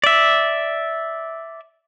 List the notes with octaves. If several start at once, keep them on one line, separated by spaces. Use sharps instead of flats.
D5 E5